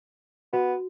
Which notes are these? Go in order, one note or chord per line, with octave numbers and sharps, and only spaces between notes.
B3 F#4